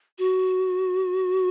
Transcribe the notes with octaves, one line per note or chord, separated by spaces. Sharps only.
F#4